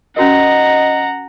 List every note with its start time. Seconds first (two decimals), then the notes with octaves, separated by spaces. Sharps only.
0.17 C#4 F#4 A#4 D#5 F#5 A#5